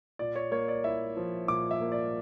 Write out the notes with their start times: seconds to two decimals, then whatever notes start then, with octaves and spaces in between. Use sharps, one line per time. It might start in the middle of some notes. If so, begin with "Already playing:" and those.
0.19 A#2 D5
0.36 C#5
0.51 A#3 C#5
0.68 D5
0.84 E4 E5
1.17 F3
1.48 A#2 D6
1.71 E5
1.81 A#3
1.92 D5